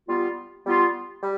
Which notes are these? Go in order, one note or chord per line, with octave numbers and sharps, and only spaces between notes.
G3 B3 F4
G3 B3 F4
G3